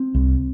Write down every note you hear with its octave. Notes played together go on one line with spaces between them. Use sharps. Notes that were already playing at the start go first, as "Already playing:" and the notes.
Already playing: C4
C2